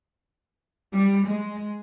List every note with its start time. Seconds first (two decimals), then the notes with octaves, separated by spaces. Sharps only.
0.92 G3
1.25 G#3